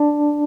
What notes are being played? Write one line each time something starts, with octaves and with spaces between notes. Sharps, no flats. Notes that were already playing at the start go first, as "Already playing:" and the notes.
Already playing: D4